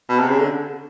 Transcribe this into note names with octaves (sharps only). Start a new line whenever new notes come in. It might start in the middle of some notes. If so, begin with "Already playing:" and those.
B2
C3
C#3
D3